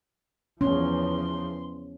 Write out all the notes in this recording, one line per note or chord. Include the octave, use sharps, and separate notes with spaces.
E2 F3 C#4 C6